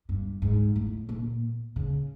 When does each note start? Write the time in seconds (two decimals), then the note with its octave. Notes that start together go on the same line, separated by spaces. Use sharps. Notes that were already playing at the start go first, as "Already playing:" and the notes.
0.09 G2
0.42 G#2
0.76 A2
1.09 A#2
1.76 C#3